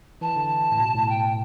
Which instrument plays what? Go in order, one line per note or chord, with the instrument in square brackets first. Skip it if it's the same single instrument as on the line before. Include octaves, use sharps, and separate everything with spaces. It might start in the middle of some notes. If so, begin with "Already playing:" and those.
[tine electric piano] E3 [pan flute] A5
[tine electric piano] D3
A2
B2
A2
[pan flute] G5